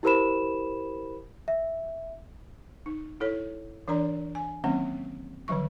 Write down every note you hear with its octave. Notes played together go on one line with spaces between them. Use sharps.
E4 G4 A#4 C5 B5 E7
E5
D#4
E4 A4 C#5
E3 D4 A#4 D5 A#5
G#5
D#3 F#3 A#3 C4 C#4 F#5
D3 D#3 F3 F#3 C#6